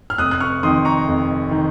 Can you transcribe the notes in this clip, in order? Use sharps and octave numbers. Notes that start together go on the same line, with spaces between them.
F6
F1 D#6 F#6
F#6
C#6 F6
F2 D#3 C6 D#6
A#5 C#6
F1
D#3